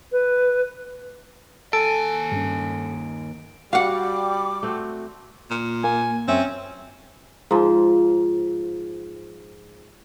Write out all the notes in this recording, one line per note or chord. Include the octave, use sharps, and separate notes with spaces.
B4
D#2 A4 G#5 D7
G2 C#4
G3 F#4 F5 F#5 D6
A3 C4 F#4
A#2
A#3 G#5
F#2 C4 C#4 E5
G#2 F3